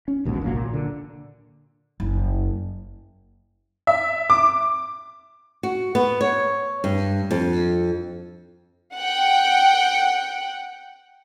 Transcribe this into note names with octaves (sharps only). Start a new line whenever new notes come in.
C#4
A#1 D#2 G#2 B2
G1 C2 F#3 A#3
A#2
D3
F#1
E5
D6
F#4
B3
C#5
G2
F2
F#5 G5